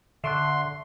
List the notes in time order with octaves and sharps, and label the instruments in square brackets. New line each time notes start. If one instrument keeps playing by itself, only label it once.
[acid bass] D3 [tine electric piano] E5 C#6 F#6 [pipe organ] C6